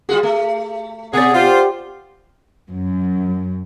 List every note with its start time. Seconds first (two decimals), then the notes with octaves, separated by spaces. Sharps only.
0.09 G3 F4 F#4 G#4
0.23 A3
1.13 B2 G#4 D5 F#5
1.34 F4 G4 C5
2.69 F#2